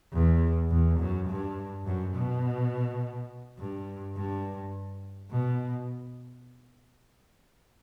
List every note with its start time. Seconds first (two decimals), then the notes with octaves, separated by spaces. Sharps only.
0.13 E2
0.70 E2
1.00 F#2
1.28 G2
1.86 F#2
2.14 B2
3.59 G2
4.16 G2
5.31 B2